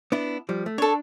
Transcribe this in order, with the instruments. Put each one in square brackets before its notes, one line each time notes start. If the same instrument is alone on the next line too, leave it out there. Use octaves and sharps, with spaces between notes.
[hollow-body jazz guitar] B3 D4 E4
F3 G3
A3
[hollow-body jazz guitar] D4 [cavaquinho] A4 C#5